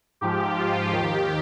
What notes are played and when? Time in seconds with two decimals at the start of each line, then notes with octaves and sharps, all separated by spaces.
0.21 G#2 F3 G4
0.56 F4
0.92 D#2 D#3 G4